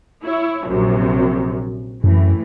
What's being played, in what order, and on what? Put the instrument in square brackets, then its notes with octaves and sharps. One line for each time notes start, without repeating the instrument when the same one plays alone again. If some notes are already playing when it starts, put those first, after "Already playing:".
[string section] E4 C#5
A#1 F#2 C3
[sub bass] F#2 [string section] A2 E3